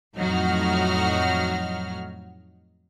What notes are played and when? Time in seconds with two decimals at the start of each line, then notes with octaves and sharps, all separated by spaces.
0.16 F2 A2 F#3 D#4 F#4 F6